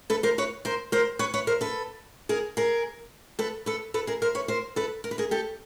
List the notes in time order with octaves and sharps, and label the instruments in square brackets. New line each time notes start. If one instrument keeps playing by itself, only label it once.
[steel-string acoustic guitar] A4 B4
A#4 C5
B4 C#5
A#4 C5
A#4 C5
B4 C#5
B4 C#5
A#4 C5
A4 B4
G#4 A#4
G#4 A#4
A4 B4
A4 B4
A4 B4
G#4 A#4
A#4 C5
B4 C#5
A#4 C5
A4 B4
A#4
B4
G#4 A#4
G4 A4